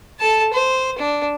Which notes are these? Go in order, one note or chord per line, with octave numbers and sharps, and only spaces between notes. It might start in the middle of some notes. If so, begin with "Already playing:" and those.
A4 A5
C5
D4